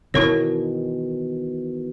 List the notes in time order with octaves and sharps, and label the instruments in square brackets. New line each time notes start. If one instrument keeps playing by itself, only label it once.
[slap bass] B2 D#3 E3 [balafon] E4 A#4 C#5